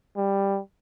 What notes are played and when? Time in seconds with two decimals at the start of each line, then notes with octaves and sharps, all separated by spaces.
0.17 G3